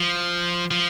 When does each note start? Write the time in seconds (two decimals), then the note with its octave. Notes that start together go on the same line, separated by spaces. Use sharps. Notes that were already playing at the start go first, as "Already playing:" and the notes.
Already playing: F3
0.71 F3